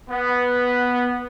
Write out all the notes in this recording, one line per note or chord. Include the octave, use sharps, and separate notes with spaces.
B3